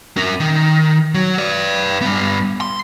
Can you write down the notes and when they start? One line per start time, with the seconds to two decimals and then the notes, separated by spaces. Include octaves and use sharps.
0.17 C#4 A#4
0.40 D#3
1.14 F#3
1.38 B4 D5
2.01 G2 B3
2.61 C6